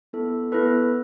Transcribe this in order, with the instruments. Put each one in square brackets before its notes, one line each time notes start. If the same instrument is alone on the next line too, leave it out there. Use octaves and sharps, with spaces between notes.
[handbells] B3 E4 A4
B3 E4 A4 B4